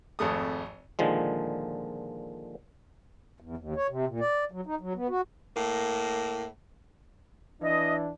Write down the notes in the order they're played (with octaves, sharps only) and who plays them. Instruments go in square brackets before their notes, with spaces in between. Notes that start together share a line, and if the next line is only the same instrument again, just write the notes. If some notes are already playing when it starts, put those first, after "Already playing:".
[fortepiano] G#1 F2 A3 D#6
[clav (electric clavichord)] A#2 D3 D#3 F3 G#3
[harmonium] E2
D#2
C#5
C3
A#2
D5
F#3
D#4
F#3
B3
F#4
[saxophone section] A2 A#3
[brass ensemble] E3 D4 [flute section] D#5